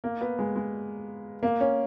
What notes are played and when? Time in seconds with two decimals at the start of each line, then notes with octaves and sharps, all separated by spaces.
0.04 A#3
0.21 B3
0.39 G#3
0.56 G#3
1.43 A#3
1.61 C#4